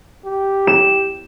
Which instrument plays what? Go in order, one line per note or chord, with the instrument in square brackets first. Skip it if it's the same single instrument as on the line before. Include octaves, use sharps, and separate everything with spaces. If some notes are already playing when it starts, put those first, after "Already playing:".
[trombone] G4
[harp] E7